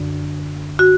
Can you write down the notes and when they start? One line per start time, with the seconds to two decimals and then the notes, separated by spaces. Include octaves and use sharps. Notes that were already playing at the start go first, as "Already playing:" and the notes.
Already playing: F#2 D3 D4
0.79 F#4